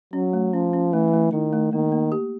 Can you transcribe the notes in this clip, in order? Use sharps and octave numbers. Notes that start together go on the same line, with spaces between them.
F#3 C#4
A3
F3 C#4
C#4
E3 A3
A3
D#3 E4
A3
D#3 A#3
A#3
G4